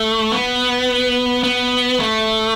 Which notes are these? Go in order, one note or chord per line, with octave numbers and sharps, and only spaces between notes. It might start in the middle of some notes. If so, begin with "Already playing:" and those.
Already playing: A3
B3
B3
A3